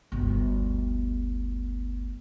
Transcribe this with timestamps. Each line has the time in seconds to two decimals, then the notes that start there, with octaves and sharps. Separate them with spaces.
0.12 G1 D2